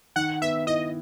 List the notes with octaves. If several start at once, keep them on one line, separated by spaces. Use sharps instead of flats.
D#3 F#5
B3 E5
E4 D#5